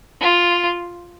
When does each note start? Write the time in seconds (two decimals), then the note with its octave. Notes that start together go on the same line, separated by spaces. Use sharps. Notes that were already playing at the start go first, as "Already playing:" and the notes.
0.21 F4